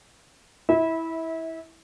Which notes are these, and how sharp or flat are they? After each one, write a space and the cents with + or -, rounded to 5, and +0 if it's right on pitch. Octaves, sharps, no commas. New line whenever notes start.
E4 -10 E5 -30